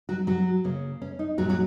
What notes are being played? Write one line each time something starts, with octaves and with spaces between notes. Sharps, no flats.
F#3 F#4
F#3 F#4
C#3 A#3 C#4
C#4
D#4
A#2 F#3 G#3 C#4 F#4
F#3 F#4